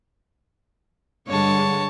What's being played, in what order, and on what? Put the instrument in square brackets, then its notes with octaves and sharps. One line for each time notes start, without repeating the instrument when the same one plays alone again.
[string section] G2 D3 G#3 [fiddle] C#5 A5